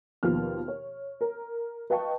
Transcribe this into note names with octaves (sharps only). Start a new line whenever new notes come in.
D#2 B2 F3 F6
C#5
A#4
B4 D#5 F5 G5 A5 C#6